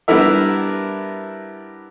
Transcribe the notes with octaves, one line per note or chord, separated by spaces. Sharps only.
G3 B3 D4 E4 A#4 E5